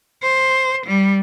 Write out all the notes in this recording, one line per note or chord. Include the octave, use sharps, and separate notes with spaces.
C5
G3